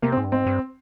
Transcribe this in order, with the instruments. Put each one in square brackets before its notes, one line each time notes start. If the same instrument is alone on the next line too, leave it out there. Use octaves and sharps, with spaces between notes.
[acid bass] C3 [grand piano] A#3
[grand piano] C4
[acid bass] G#2
G2
[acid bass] G#2 [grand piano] C4
[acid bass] G2